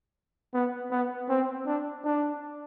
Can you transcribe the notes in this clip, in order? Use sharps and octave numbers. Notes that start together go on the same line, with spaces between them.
B3
B3
C4
D4
D4